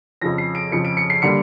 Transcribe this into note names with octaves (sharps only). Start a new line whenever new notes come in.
F2 C#3 F3 A#6
C7
D7
F2 C#3 F3 C#7
D7
C#7
C7
D3 G3 A#3 C#7